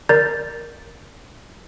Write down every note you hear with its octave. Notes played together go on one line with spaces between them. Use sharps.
A#4 D5 A#5 G6 A6